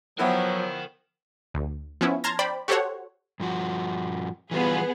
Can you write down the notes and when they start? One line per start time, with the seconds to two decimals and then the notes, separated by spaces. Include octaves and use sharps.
0.19 F3 F#3 B3 E4 F#4 A#4 G5
1.54 D2
2.01 F3 B3 C#4 E4
2.24 A5 A#5 C6 F6 G#6 A#6
2.39 C5 D5 G5 B5
2.68 F#4 G4 A4 C5 C#5 F#5
3.40 G2 F3 F#4
4.51 E3 G3 B3 F4 G#4